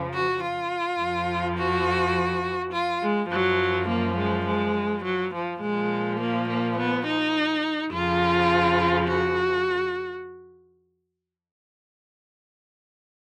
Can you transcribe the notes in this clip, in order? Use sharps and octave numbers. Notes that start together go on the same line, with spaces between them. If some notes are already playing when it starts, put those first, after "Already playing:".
Already playing: F2 C#3 F3
F#4
F4
F2 F3
F#4
F4
G#3
F#2 F3 F#3
A#3
G#3
G#3
F#3
F3
A#2 F3 G#3
A#3
A#3
B3
D#4
F2 C#3 F3 F4
F#4